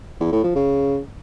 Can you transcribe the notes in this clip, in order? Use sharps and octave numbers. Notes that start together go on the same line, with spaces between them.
E2
A2
F3
C#3